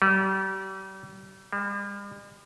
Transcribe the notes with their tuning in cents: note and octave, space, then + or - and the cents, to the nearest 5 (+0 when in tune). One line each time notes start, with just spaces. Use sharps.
G3 -35
G3 +45